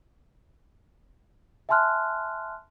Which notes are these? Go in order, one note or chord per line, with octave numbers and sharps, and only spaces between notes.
E5 G#5 A5 C6 F6 F#6